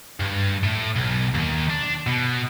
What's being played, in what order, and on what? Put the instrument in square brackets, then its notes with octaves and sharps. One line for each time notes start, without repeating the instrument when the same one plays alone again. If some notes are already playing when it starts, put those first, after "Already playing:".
[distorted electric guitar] G2
A2
B1
D#2 D#3
D4
B2